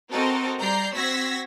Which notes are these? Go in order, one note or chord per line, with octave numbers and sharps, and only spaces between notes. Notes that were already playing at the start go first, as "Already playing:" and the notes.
C4 F#4 A4 A#4 D#5
G3 D5 A#5 G6 C7
C4 F#4 E6 G#6 A#6 B6